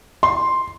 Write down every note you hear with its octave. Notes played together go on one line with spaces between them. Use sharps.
C6